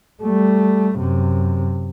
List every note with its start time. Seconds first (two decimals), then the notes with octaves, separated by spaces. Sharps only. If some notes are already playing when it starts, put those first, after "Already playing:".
0.23 G3 A3
0.97 F#2 C3